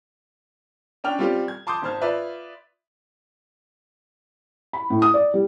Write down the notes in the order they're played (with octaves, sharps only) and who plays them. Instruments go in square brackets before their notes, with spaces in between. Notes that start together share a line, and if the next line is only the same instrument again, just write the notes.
[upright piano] C#4 D4 G5 F6 F7
G3 C4 F4 G4
G#6
A5 C6 D6 D#6 G6
G#1 G#2 C5 A5 F6 G#6
F4 B4 D5 E5
[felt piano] B5
A2
D#6
D5
G3